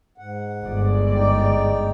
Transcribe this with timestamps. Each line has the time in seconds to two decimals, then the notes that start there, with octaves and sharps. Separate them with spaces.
0.18 G#2 F#5
0.65 G1 G#3 D5
1.15 D#4 G5